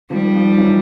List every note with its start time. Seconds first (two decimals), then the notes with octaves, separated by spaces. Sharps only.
0.10 D#3 F3 G3
0.34 D#3 F3
0.58 E3 F#3